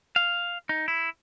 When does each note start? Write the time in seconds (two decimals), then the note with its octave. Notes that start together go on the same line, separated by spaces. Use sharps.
0.16 F5
0.69 D#4
0.88 E4